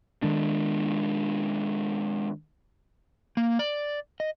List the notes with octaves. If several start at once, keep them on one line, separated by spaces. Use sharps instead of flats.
D#3 G#3 D4
A#3
D5
D#5